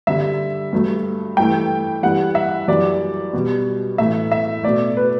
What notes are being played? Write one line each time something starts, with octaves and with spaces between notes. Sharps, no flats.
G2 D3 G3 E5
G2 F#3 A3
G2 E3 A3 G5
G2 E3 G3 F#5
E5
F#2 E3 G3 D5
B2 G3
A2 E3 A3 E5
E5
B2 A3 D5
B4